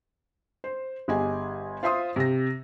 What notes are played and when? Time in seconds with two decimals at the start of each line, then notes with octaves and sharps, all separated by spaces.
0.64 C5
1.08 G1 G4 G#4 D#5 G#5
1.83 F4 C5 E5 C6 D#6
2.16 C3 G5 A#6